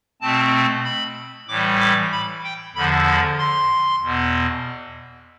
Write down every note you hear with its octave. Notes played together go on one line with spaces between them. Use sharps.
B2 A3 C4 A5
B5
A2 E3 G3 D6
D6
B5
G5
E2 D3 F3 B5
B5
C6
E2 B2 B3